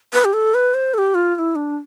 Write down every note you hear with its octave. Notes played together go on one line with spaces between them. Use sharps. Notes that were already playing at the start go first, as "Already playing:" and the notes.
B4
G4
A4
B4
C5
A4
G4
F4
F4
E4
D4